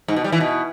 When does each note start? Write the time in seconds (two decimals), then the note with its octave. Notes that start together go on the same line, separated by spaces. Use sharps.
0.08 G#2
0.16 B2
0.24 G3
0.32 E3
0.40 B2